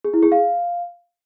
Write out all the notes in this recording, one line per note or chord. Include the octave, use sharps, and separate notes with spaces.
G#4
E4
G#4
F5